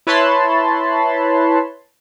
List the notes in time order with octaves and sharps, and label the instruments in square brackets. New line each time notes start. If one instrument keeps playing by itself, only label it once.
[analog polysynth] E4 B4 C#5 A5 B5 C6